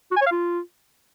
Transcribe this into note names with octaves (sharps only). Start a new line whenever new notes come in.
F#4
G#5
C#5
F5
F4